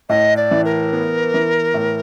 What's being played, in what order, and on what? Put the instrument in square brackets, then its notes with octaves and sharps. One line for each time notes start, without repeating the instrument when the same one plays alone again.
[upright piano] A2 [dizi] D#5
[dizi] D5
[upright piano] E3
[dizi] A#4
[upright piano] B3
E3
A2